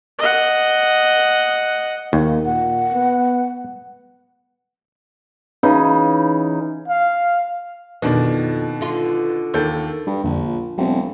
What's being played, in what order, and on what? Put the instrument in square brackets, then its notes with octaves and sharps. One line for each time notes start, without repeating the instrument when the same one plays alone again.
[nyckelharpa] D#5 F#5
[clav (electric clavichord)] D#2 [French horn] A#3
[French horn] A#2 [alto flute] F#5
[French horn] B3
[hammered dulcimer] C#3 E3 D#4
[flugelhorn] F5
[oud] F2 [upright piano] B2 D#3 D4
[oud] D3 F4
[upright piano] D#2 A4 G6
[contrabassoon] G2 [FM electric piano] G3
[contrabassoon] A#1 [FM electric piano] F2 D3
[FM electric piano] F4
[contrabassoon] E1 [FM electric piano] F#3 G3 C4